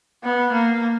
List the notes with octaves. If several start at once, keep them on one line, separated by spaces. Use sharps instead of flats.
B3
A#3